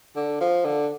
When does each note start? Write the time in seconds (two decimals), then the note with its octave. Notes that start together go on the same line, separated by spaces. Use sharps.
0.16 D3
0.41 F3
0.65 D3